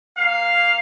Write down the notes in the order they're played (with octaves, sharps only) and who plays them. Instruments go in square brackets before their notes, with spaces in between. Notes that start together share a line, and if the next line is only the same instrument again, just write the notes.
[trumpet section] A#3 F5